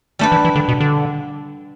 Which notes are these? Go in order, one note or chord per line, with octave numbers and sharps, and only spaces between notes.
G3 A3 D4 B4
E3
E3
D3
B2
D3